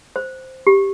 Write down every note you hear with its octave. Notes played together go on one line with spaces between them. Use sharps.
C5
G4